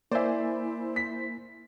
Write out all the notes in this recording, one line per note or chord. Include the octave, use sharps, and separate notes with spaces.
A#3 E4 C5 D5 E5 G#5
B6